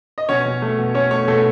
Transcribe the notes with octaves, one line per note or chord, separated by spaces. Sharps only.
D#5
B2 C#4 C#5
B2
A3
B2
A3 C#4 C#5
A3 C#4 C#5
B2 A3 A4